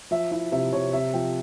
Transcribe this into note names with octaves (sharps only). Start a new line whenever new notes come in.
F3 E5
E4 E5
C3 E5
C3 C#5
C3 E5
F3 G5